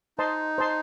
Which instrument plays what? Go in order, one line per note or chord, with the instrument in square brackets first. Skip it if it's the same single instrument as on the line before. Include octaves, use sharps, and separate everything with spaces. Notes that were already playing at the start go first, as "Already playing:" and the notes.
[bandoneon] D#4 [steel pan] C5 D#5 A5 C6
[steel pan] C5 D#5 A5 C6